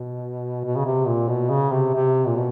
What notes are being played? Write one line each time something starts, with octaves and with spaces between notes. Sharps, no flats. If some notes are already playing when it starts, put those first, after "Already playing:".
Already playing: B2
B2
C#3
C3
A#2
B2
C#3
C3
C3
A#2
B2